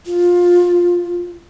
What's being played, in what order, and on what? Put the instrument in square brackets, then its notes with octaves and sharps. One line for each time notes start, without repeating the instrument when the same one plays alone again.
[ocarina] F4